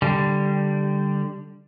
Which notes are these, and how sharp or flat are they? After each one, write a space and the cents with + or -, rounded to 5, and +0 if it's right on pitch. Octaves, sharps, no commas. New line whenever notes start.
D3 +0 G3 +0